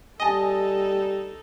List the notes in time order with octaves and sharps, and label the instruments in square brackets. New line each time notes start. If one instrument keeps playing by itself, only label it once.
[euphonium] G3 [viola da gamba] D#4 A4 [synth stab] D#5 [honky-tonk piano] G#5 A5